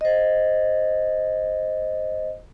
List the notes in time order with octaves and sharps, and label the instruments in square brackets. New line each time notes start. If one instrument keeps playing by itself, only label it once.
[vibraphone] C5 D#5